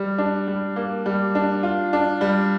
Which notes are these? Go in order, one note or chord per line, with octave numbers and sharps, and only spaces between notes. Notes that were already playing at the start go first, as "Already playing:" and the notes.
Already playing: G3
D4
G3
A#3
G3
D4
F4
D4
G3